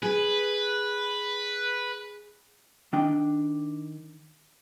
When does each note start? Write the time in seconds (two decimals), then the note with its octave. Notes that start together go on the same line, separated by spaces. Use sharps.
0.03 G#4 B4
2.93 D#3 D4 G5